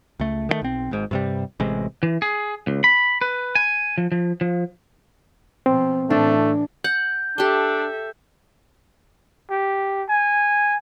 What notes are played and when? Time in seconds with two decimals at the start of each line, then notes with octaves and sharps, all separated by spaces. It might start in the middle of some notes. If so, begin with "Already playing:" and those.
0.20 C#2 A3
0.49 D#3 E3 A3
0.61 B1 C4
0.91 G#1 G#2
1.11 G2 C3 G3
1.60 A1 C3 G#3
2.03 E3
2.22 G#4
2.67 C#2
2.84 B5
3.21 B4
3.55 G#5
3.98 F3
4.12 F3
4.41 F3
5.66 B2 F3 C4
6.10 A2 E3 A3 D4
6.84 F#5 G6
7.38 D4 G4 A4 E5 G5
9.50 G4
10.09 G#5